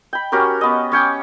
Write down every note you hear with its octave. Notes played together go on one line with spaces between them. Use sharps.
G5 B5
C#4 F#4 G4 A#4
B3 D#5
C#4 C#5 G5 D6